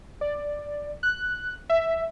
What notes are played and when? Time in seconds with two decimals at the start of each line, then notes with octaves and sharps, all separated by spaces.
0.21 D5
1.03 F#6
1.70 E5